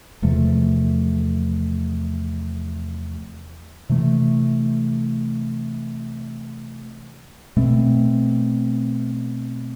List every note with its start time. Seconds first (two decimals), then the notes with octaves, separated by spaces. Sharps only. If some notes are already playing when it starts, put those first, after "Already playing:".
0.22 E2 C3 F3 A3
3.89 C3 E3 A3
7.57 B2 A3 C4